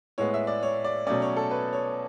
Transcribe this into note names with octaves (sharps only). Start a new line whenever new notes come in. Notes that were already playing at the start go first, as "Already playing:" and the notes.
A2 G#3 B3 C#5
E5
D5
C#5
D5
B2 F#3 A3 C#4 D5
C#5
A4
B4
C#5